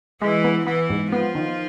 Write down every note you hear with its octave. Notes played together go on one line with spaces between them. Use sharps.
E3 G#3 E4
B3
E3 B3 E4
G#2
F3 B3 F4
D#3